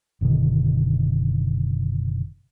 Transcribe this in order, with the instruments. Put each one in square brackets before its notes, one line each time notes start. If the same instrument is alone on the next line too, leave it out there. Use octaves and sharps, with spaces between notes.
[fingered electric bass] F#1 B2 D3 D#3